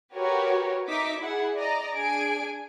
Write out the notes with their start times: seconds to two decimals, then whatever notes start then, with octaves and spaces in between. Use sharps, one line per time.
0.15 F#4 G4 A#4 B4 C#5
0.88 D#4 D#5 E5 D6 B6
1.18 E4 G#4 F#5
1.56 D5 D#5 A#5
1.96 D4 G#4 G#5 D7